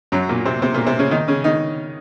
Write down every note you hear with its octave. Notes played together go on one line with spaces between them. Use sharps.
F#2 F#3
A#2 A#3
C3 C4
C3 C4
A#2 A#3
C3 C4
C#3 C#4
D#3 D#4
C#3 C#4
D#3 D#4